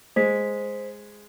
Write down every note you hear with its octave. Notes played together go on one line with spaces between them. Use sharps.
G#3 C5 B6